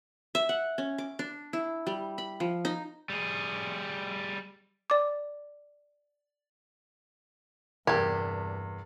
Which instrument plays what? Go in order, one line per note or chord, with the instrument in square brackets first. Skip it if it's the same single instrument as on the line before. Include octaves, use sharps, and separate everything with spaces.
[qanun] E5
F#5
C#4
D6
D4
E4
G3
B5
F3
D#4
[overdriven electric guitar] G3 G#4
[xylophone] D5 D6
[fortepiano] E2 C3 [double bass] G2 [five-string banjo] D4 G4 [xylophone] A#4 G#6